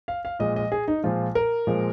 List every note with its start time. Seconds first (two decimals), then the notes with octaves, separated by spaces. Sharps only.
0.08 F5
0.25 F5
0.39 A#2 F3 G#3 D#5
0.56 D#5
0.72 G#4
0.88 D#4
1.03 A#2 F3 G#3 F4
1.35 A#4
1.67 A#2 F3 G#3